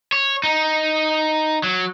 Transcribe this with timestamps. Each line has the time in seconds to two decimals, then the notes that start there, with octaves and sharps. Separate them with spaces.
0.12 C#5
0.44 D#4
1.64 F#3